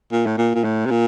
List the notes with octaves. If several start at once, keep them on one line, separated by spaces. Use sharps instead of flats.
A#2
A2
A#2
A#2
A2
C3
A#2